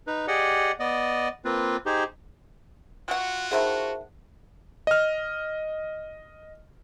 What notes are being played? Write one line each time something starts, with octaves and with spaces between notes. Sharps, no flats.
D#4 B4
G4 G#4 D5 D#5 F#5
B3 D5 D#5
A#3 C4 F4 B4
D#4 G4 G#4 C5
F4 F#4 F#5 G5
D#3 E4 G#4 C5 F#5 A5
D#5 F6